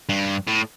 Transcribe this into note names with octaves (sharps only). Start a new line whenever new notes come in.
G2
A2